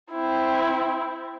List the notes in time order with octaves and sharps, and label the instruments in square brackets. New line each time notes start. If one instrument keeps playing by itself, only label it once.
[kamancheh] C4 E4